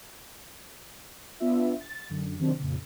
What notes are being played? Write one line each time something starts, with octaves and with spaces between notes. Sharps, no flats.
B3 D4 F4 E5
A6
F#2 D3
C3 D#3 F#3 C4 D4
F2 A#2 C#3